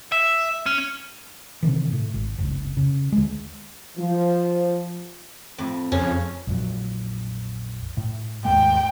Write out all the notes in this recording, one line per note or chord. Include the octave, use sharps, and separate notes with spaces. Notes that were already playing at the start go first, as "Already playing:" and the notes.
E5
C#4
C3 D#3 E3
A2
G#1
F1 C#2
C#3
D2 G#3
F3
F2 A2
F2 C#3 C#4
A#1 F2 F#3
A2
D#2 G#2 A3 G5